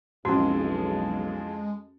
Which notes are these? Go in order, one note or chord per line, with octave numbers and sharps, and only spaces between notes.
B1 F2 E3 G#3 C#4 F#4